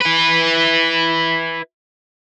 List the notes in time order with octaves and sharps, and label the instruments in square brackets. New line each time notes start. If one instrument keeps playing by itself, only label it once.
[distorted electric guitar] E4 B4